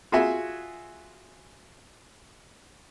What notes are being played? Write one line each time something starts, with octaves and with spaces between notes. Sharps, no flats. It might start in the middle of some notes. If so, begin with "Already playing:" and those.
F4 F#4 G#4 E5 G#5